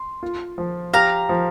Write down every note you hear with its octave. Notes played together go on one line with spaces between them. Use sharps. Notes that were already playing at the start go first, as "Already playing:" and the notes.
Already playing: C6
F4
F3
G4 F5 A#5
F3